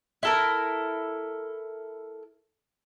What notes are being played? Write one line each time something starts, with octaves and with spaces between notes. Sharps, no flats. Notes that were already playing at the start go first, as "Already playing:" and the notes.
E4 A4 A#4